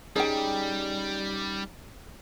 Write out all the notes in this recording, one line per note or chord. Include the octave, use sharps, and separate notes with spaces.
G3 C#4 D#4 G#4 G5